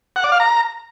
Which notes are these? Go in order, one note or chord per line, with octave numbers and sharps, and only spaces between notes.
F#5
D5
F5
A#5